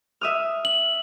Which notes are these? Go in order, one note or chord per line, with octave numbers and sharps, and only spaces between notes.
E5 D#6 F6
F#7